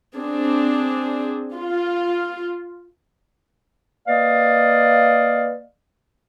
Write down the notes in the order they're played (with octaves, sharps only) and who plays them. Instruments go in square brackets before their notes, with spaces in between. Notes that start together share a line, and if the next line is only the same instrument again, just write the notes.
[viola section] C4 D4 G#4
F4
[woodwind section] A#3 B4 D5 D#5 F5